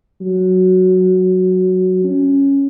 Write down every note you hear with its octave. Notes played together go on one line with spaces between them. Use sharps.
F#3
C#4